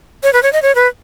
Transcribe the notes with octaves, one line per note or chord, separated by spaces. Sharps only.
C#5
B4
C#5
D#5
C#5
B4